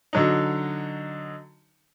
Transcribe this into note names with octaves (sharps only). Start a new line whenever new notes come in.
D3 F#3 D#4